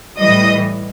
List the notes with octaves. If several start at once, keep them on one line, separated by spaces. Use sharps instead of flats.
A2 E3 G3 D#5